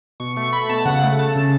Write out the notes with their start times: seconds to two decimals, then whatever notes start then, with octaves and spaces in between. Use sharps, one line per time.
0.20 B2 C#6
0.36 A3 C#6
0.52 A3 B5
0.69 B2 A5
0.86 C#3 F#5
1.02 A3
1.19 A3 A5
1.36 C#3